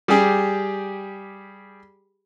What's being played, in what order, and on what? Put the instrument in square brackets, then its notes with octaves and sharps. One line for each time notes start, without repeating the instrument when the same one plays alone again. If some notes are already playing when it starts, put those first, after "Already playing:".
[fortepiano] G3 G4 G#4